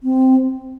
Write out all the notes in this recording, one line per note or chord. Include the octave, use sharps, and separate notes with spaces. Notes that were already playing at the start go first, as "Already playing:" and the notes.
C4